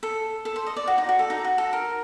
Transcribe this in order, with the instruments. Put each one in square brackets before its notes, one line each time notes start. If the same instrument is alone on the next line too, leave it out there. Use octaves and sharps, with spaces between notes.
[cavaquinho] A4
A4
C5
D#5
D5
F#4
D#4
F#4
A4
D#4
F#4
A4
A#4